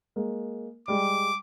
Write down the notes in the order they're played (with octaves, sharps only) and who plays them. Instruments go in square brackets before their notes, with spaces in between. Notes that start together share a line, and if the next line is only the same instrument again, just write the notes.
[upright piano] G#3 A#3
[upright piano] G3 G#3 [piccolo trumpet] D6